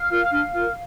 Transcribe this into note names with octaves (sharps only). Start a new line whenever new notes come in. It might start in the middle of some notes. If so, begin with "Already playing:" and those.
Already playing: F5 F6
F4 A#4
D4
F4 A#4